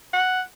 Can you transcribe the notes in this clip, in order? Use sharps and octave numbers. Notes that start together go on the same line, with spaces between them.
F#5